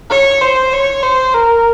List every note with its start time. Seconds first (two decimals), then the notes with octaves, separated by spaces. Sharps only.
0.11 C#5
0.41 C5
0.73 C#5
1.03 C5
1.34 A#4